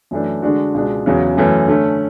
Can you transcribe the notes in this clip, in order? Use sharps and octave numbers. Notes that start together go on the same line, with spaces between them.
F#2 E3 A3 D4
D3 G#3 D4 F#4
C#2 B2 G#3 D4
E2 C#3 F#3
F#2 E3 A3 C#4
D3 A3 C#4